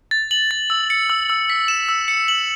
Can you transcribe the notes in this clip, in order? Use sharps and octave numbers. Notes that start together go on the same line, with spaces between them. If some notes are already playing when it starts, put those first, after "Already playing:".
A6
F#7
A6
E6
C#7
E6
E6
B6
E7
E6
C#7
F#7